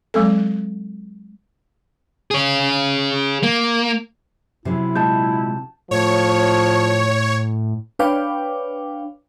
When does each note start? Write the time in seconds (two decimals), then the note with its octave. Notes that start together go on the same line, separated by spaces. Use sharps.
0.14 F#3 G#3 C4 A4
2.31 G#4 C#5
3.43 A#3
4.65 C3 F#3 E4 G#4
4.96 A#2 G#3 A5 G6
5.91 A2 F3 C#5
7.99 D4 B4 C#5 F5 G5 D6